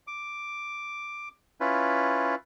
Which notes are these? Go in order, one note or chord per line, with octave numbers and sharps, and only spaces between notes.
D6
C#4 E4 F4 B4